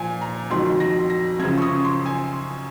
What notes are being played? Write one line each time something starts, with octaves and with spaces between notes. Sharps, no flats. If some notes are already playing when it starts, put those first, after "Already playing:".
Already playing: A#2 F3 G#5
A#5
F2 D#3 F#3 C6
A#6
A#6
F#2 C#3 F3 G#6
C#6
D#6
C6
G#5